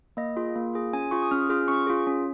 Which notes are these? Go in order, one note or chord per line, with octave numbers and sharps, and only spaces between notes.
A#3 D#5
F4 G#4
A#3
F4 G#4
C#4 G#5
F4 G#4 C#6
D#6
C#4 F6
F4 G#4 F6
C#4 C#6
F4 G#4
C#4